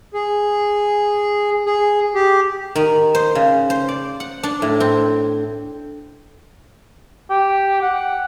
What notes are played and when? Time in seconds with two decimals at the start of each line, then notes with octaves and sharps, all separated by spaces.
0.14 G#4
1.66 G#4
2.15 G4
2.76 D#3
3.15 C5
3.35 C#3
3.70 C5
3.88 D5
4.20 F#5
4.43 D4
4.62 A2
4.80 C4
7.30 G4
7.82 F#5